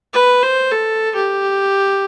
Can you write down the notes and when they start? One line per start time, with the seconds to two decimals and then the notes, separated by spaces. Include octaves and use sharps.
0.14 B4
0.43 C5
0.71 A4
1.15 G4